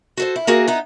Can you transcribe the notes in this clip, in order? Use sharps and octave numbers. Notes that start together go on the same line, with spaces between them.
F#4 A4 C5
E4
A#3 F#4 G#4 A#4
B3 D#4 E4